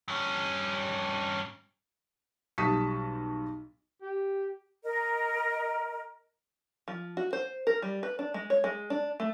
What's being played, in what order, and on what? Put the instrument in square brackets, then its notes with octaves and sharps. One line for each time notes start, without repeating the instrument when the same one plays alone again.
[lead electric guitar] G2 C#4
[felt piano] B1 G3 A5 C#6 D#6 B6
[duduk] G4
[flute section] A#4 D#5
[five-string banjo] F3
F#4
C5
A#4
G3
B4
D4
G#3
C#5
G#3
D4
A3